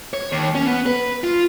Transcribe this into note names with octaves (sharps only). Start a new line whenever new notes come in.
C#5
D#2
C#4
B3
B4
F4